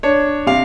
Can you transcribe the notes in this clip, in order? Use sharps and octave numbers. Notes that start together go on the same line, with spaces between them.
D4 C#5
C3 F5